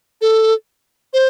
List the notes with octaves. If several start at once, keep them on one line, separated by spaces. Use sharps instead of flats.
A4
C5